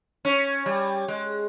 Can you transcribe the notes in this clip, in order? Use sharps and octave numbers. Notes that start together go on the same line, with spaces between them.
C#4
G3
G#3